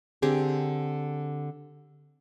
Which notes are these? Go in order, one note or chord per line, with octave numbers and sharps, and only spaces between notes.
D3 C4 G4 G#4